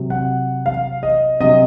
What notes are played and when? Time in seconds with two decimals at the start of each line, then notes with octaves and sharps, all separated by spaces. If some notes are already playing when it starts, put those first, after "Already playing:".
Already playing: C3 F#3
0.10 F#5
0.66 F5
1.03 D#5
1.41 C3 F#3 D#5